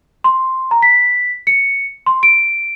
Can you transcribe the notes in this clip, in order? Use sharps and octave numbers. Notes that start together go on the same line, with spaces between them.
C6
A#5
B6
C#7
C6
D7